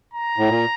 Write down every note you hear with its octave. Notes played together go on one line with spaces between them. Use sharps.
A#5
A2
A#2